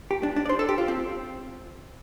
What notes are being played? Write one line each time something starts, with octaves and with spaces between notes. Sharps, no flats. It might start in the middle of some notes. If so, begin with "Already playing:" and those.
G4
D4
D4
D5
C5
A4
G4
F4
C4